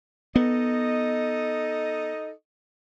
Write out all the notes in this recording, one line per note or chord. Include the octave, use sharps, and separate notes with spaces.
B3 D#4 A4 D#5